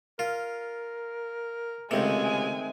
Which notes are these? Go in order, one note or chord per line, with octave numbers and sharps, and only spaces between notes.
F4 A#4
C#2 C3 D#3 G#3 A3 C4 G#5